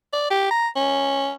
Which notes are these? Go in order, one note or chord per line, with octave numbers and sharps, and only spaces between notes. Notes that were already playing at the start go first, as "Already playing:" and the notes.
D5
G4
A#5
C#4